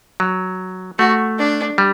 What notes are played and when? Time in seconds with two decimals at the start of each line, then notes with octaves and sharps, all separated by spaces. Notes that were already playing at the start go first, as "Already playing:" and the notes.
0.20 F#3
0.99 A3 F#4
1.39 D4
1.78 G3